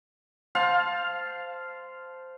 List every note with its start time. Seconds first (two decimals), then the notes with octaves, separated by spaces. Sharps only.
0.55 C5 F5 A5